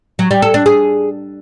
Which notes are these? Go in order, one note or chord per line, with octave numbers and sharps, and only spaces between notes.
F#3
G3
A4
D4
G#4